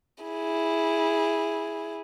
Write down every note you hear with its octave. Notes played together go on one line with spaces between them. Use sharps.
E4 G#4